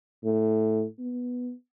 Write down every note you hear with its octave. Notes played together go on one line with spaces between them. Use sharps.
A2
B3